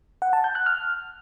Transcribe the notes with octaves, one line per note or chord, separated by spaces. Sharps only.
F#5
A5
G6
F#6
F6